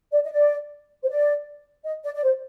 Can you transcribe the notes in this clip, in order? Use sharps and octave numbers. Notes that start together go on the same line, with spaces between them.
D5
D#5
D5
C5
D5
D#5
D5
D5
C5